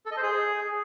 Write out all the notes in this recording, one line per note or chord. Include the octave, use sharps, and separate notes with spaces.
A4
D#5
C5
G#4